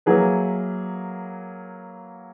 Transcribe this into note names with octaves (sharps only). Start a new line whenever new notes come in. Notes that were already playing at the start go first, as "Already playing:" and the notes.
F#3 A#3 E4 G#4 B4